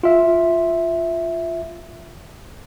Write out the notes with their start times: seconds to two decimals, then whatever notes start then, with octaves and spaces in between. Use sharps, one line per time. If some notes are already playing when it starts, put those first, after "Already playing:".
0.04 F4 E5